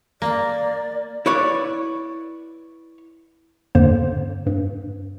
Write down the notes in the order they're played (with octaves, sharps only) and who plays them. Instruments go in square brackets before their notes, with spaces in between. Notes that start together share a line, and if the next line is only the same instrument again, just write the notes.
[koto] A#3 [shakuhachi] D5
[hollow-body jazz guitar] E4 B4 C#5 D5
[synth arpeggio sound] E2 G2 D3 A#3 C5
G2